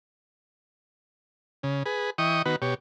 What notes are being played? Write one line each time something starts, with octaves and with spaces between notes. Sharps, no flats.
C#3
G#4 B4
E3 D#5 G5 C#6 D#6
D#3 B3 F#4 B4
B2 G4 C#5